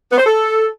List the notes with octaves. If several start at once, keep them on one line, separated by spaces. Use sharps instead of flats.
B3
C5
A4